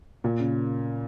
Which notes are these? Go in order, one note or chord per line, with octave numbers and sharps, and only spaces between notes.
A#2
C#3